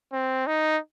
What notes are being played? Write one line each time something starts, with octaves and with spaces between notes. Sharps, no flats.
C4
D#4